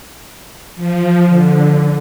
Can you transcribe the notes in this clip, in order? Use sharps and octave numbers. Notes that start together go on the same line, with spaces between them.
F3
D3